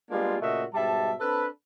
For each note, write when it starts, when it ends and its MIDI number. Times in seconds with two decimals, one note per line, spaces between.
0.10 0.36 55
0.10 0.36 56
0.10 0.36 58
0.10 0.36 59
0.10 0.36 62
0.10 0.36 65
0.41 0.64 46
0.41 0.64 49
0.41 0.64 57
0.41 0.64 66
0.41 0.64 75
0.41 0.64 76
0.74 1.13 44
0.74 1.13 47
0.74 1.13 55
0.74 1.13 76
0.74 1.13 81
1.20 1.47 60
1.20 1.47 62
1.20 1.47 69
1.20 1.47 71